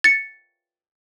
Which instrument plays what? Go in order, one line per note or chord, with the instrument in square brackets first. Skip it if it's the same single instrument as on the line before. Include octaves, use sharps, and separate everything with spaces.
[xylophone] A6 C#7